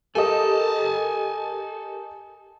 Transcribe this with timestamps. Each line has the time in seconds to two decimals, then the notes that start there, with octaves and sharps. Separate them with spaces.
0.15 G4 A4 A#4 D#5 G#5 A5